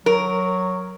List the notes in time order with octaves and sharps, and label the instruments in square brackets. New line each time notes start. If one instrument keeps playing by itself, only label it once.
[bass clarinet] F#3 [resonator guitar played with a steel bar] A#4